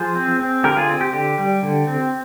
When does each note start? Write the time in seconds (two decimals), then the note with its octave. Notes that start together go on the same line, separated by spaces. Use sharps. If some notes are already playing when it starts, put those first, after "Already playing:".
Already playing: F3 G#4 C5
0.15 C4
0.40 C4
0.64 D3 G4 A#4
0.77 F4 G#4
0.89 C4
1.01 G4
1.13 D3 G4
1.38 G3
1.63 D3
1.87 C4